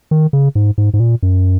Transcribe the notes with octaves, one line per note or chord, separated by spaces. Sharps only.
D#3
C#3
G#2
G#2
G#2
A#2
F#2